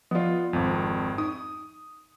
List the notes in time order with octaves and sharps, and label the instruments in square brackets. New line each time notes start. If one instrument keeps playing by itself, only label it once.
[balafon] F3 D5 [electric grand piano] B3 F4
[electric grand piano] G#1 F2
[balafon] D#4 [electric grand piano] D#6